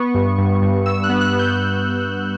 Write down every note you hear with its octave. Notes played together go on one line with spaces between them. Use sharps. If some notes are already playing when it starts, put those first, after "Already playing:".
Already playing: B3 C#6
G2
G2
G2
G2 E6
F#6
B3
F#6
B3
G6